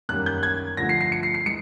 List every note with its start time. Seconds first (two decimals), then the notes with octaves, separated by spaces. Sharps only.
0.09 F#2 D#3 G3 A#3 F#6
0.26 G6
0.43 G#6
0.77 G2 D3 F3 A3 A#6
0.89 C7
1.01 C7
1.12 C#7
1.23 C7
1.34 C7
1.46 E3 G#3 C#7